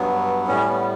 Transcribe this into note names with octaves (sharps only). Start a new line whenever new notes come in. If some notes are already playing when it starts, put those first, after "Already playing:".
Already playing: G2 F#3 B3
A2 G3 C#4
B3